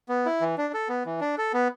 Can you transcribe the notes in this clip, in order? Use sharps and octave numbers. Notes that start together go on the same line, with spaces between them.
B3
E4
E3
D4
A4
B3
E3
D4
A4
B3